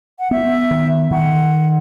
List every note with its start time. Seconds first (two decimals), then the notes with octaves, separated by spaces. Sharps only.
0.19 F#5
0.31 B3 E5
0.71 D#3
1.11 D#3 F#5